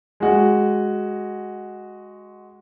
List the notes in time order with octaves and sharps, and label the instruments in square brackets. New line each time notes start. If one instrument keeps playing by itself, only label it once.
[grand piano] G#3 F#4